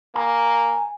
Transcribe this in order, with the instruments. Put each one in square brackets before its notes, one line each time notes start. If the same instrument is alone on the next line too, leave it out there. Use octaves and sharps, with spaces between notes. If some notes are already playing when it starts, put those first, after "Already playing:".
[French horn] A#3 [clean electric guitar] G#5 A#5